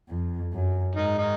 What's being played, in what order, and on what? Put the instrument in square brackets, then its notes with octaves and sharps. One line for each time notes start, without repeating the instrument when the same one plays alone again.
[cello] F2
F#2
[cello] G#2 [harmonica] D#3 D#4
[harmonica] D#3 D#4